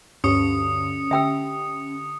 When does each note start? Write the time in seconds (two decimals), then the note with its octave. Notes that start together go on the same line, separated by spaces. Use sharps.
0.24 D2 G2 D3 C#4 G4 C#6 D#6 C#7
1.11 D3 G4 E5 G5 E6